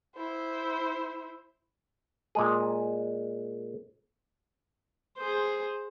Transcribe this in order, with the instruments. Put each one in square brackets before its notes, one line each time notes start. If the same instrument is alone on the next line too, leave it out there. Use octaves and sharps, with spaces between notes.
[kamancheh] E4 C5
[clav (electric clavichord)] A#2 G#3 G#4
[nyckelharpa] G#4 C5